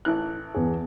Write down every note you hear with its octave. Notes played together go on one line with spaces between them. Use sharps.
A1 E3 F#6
E2 G#4